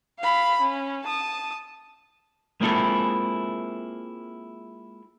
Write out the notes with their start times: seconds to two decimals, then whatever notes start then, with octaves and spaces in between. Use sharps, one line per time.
0.20 F5 B5
0.61 C#4
1.04 A5 D#6
2.61 G#3 A#3 C4 E4 F4 A4